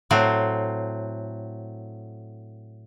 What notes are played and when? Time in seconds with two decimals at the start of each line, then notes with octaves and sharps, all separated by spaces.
0.11 A2 F#3 C4